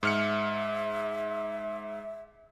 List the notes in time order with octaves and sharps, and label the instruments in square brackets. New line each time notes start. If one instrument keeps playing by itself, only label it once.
[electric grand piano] G#2 F6 C#7 [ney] E5